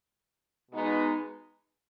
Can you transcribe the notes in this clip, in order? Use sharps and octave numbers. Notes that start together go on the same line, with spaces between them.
B2 G#3 B3 D#4